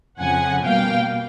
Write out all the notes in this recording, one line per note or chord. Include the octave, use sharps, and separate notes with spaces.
F2 C#3 F3 F#5 G#5
B2 G3 A#3 F5 G5